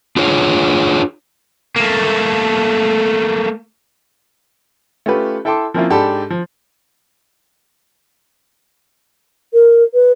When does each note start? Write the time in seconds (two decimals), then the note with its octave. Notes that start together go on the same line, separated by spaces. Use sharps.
0.17 D4 F4 F#4 G#4 C#5
1.76 A3 A#3
5.06 A3 C#4 F4 G4 B4
5.45 E4 A4 G5 A5 C6 D6
5.74 F3 A#3 C4 C#4 E4 F4
5.90 G#2 D4 G4 A4 A5 B5
6.30 F3
9.53 A#4
9.94 B4